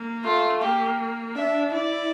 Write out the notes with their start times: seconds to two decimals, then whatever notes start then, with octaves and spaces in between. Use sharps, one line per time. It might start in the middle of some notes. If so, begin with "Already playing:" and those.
Already playing: A#3
0.24 A3 F4
0.61 A#3 G4
1.36 D4 E5
1.72 E4 D5